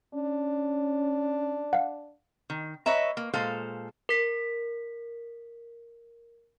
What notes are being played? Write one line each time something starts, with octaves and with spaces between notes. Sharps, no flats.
C#4 D4
F5 F#5
D#3
B4 C#5 D#5 E5 A#5
A#3
A#2 G#3 A4 C5 F5
A#4 B6